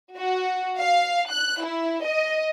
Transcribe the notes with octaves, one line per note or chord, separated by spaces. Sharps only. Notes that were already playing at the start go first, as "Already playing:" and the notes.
F#4
F5
F#6
E4
D#5